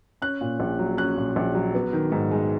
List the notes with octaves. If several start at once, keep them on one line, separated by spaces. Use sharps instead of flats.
C#4 F#6
A#2
A#1
F#3
C#4 F#6
A#2
A#1
F#3
B3
D#3
G#2
G#3